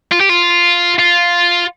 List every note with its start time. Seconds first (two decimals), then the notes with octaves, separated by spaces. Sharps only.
0.11 F4
0.20 G4
0.29 F4
0.99 F4